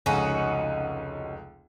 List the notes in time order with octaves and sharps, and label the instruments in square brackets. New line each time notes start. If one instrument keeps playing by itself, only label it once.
[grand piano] F1 C#2 [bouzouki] C#4 D#4 F#4